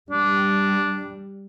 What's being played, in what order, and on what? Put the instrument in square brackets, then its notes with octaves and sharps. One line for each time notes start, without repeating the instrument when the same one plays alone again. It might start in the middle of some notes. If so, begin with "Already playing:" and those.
[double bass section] G3 [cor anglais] D4